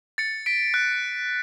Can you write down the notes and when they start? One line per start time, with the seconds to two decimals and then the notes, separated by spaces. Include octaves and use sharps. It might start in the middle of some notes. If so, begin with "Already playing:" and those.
0.18 A6 C#7
0.46 B6 D7
0.74 F#6